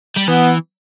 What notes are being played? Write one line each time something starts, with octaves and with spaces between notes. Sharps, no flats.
G3
E3 B3